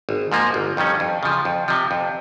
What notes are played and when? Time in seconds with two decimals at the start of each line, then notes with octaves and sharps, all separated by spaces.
0.09 G#1
0.32 G#2 F3 A#3
0.54 G1
0.77 F2 D#3 G3 C#4
1.00 F2
1.23 C#3 F3
1.45 F2
1.68 C3 F3
1.91 F2